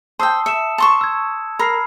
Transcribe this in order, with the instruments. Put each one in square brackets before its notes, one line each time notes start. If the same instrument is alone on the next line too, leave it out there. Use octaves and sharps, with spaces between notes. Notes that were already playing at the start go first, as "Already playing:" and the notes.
[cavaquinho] C5 G5 [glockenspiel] A5 D#6 E6
[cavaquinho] E5 [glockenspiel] C#7 E7
[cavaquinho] A5 C6 C#6
[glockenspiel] E6 G#6
[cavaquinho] A#4 [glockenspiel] B5 F6 C7